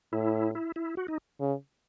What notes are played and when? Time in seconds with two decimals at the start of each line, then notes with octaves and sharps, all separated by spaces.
0.13 A2 E4
0.55 E4
0.76 E4
0.97 F#4
1.08 D#4
1.40 C#3